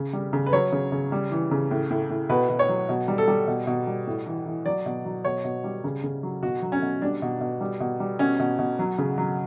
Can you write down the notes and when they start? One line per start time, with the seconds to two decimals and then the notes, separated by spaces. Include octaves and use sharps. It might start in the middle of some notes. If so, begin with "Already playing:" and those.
Already playing: C#3
0.13 G3
0.33 C#3
0.46 B4
0.53 F#3 C#5
0.72 C#3
0.92 C#3
1.12 G3
1.31 E3
1.51 C#3
1.71 A2
1.91 A2
2.10 A2
2.29 B2 B4
2.49 B2
2.59 C#5
2.69 F#3
2.89 B2
3.08 G3
3.18 A4
3.28 G3
3.48 B2
3.67 B2
3.87 G3
4.07 A2
4.26 E3
4.46 E3
4.66 F#3 D5
4.86 B2
5.05 F#3
5.25 B2 C#5
5.44 B2
5.64 G3
5.84 C#3
6.03 C#3
6.23 F#3
6.43 B2 F#4
6.62 F#3
6.72 C#4
6.82 B2
7.02 G3 D4
7.22 B2
7.41 B2
7.61 G3
7.80 B2
8.00 G3
8.19 B2 C#4
8.39 B2
8.59 B2
8.79 F#3
8.98 C#3
9.18 F#3